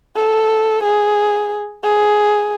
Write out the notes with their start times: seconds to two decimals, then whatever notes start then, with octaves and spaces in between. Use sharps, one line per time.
0.16 A4
0.83 G#4
1.84 G#4